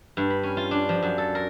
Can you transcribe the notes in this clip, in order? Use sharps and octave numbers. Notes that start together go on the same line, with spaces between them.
G2
B5
C#4
F4
D4
F3
F#2
A4
A#4